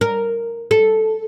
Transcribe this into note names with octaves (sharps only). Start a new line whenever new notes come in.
A#4
A4